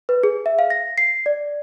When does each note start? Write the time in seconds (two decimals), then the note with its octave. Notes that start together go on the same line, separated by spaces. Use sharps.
0.09 B4
0.23 G#4
0.46 E5
0.59 F5
0.70 A#6
0.98 C7
1.26 D5